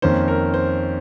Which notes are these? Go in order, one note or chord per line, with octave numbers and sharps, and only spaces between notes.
F2 D#3 A#3 C#4 C5
A#4
C5